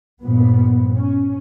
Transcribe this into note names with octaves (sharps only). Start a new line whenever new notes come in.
G2 A#2 F3 B3
C#4